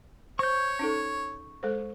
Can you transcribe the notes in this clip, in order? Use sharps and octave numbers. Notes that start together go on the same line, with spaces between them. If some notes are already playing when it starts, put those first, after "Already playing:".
C5 C#5 C#6 G6
C#4 D#4 A4
G#3 A4 C5